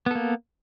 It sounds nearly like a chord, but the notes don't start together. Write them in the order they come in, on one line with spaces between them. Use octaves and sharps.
B3 A4 A#3